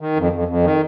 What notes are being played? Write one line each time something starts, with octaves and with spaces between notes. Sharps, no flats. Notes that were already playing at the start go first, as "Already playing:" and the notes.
D#3
F2
F2
F2
D#3